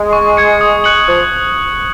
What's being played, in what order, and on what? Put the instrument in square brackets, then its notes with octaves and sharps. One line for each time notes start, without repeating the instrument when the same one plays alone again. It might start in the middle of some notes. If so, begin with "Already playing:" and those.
Already playing: [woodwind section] G#3
[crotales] C#6
G#6 C#7
D#6
F#6 C#7 F#7
[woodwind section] F3 [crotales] D#6